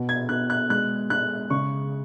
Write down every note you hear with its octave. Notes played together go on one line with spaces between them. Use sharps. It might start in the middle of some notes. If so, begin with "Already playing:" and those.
Already playing: B2
G#6
B2 F#6
F#6
G#3 F#6
G#3 F#6
C#3 C#6